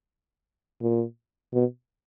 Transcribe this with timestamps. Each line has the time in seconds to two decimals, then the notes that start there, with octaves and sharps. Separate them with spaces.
0.81 A#2
1.53 B2